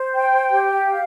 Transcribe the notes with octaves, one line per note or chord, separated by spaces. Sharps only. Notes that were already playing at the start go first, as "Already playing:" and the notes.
Already playing: C5
G5
G4
F5